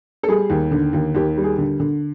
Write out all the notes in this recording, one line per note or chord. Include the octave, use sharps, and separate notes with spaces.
A4
G3 G#4
D#2
D3
D#2
D#2 G4
G3
G#4
D3
D3